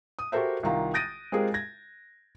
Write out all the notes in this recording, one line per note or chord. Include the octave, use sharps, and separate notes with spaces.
D#6
F#4 G4 A4 A#4 C5 E5
C2 D#3 F4 A#5
D#6 G6 A6 A#6 D7 D#7
G#3 C4 F4 G4 G#4 A#4
G#6 A#6